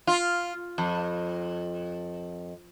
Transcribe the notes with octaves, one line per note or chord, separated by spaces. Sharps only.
F4
F2